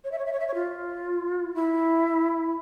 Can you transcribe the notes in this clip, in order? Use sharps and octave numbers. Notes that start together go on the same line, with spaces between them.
C#5
E5
C#5
E5
C#5
E5
C#5
F4
E4